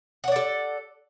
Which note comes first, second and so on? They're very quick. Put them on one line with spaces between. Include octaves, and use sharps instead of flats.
F#5 C#5 D5 A4